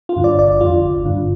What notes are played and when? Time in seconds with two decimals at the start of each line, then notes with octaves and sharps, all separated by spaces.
0.09 F4
0.16 G2 D3
0.24 D5
0.38 G1 D5
0.61 F2 D3 F4
0.83 G1
1.05 G2 D3